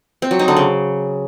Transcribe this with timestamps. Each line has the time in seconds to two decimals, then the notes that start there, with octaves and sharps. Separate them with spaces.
0.22 C4
0.31 F#3
0.39 D#4
0.48 D3
0.56 C#3